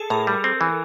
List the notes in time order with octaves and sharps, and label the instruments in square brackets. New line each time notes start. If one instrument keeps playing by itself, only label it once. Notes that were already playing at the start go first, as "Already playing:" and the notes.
Already playing: [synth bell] G#4 A4
[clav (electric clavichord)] A2 [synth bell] A#4
[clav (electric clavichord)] G3
C4
E3